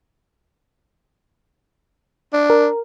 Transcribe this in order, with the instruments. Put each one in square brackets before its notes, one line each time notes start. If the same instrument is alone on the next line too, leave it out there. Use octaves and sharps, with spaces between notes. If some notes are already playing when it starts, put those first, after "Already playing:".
[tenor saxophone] D4
[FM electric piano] A#4